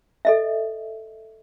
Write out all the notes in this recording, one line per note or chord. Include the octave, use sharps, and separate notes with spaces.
A4 D#5 E5